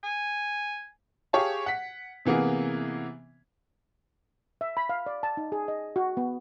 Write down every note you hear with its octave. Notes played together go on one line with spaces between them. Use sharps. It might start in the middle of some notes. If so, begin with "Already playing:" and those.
G#5
G4 G#4 C#5 F5 A5
F#5 B6
C3 E3 A#3 B3 G#4
E5
B5
F5
D5
A5
D#4
G#4
D#5
F#4
B3